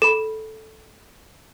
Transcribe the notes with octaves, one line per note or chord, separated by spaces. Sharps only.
A4 B5